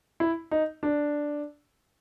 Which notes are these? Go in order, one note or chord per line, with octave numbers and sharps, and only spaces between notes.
E4
D#4
D4